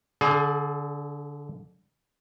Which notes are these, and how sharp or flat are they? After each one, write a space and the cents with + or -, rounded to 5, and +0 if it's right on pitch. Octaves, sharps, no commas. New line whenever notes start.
D3 -15 G#4 +30